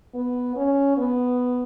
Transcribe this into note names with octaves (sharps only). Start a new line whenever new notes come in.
B3
C#4
B3